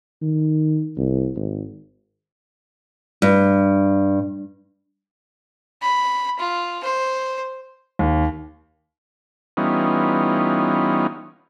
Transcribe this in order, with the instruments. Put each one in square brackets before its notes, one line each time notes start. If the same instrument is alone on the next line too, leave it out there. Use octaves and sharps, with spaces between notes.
[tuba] D#3
C2
G#1
[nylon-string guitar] G2
[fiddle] B5
F4
C5
[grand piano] D#2
[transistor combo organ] E3 G3 B3 C#4 D#4 F4